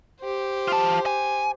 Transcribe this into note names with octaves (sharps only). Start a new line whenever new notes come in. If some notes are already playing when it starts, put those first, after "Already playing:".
G4 C5
F4 A5
G#5